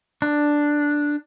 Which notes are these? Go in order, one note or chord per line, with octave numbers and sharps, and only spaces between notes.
D4